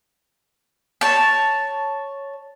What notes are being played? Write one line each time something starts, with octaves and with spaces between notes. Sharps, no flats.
C#5 A5